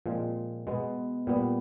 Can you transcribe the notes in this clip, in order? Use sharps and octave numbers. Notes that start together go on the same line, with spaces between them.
A#2 F3 G#3 C4
B2 G#3 B3
A#2 G3 B3